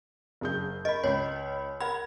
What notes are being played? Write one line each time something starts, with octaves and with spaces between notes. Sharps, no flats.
F#1 G#4 G6
A#4 D#5 B5
C#2 C#5 B5
A#4 F#5 B5 G#6